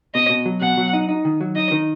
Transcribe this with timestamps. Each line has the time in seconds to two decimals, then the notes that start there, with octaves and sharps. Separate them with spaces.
0.14 B2 D#5
0.30 B2
0.46 F#3
0.61 B2 F#5
0.77 F#3
0.93 D#4
1.09 D#4
1.25 D#3
1.41 F#3
1.56 D#4 D#5
1.71 D#3